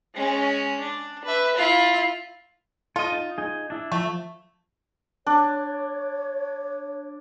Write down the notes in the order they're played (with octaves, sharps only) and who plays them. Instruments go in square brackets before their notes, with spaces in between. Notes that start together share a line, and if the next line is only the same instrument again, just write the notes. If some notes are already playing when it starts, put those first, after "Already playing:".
[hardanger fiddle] G#3 C#4
D4
B4 E5
E4 F4
[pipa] F4 [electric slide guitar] A4 D#5
[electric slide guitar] D#4
D#4 G#4
D4 E4
[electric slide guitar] F3 [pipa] A3
[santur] D4 [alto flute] C#5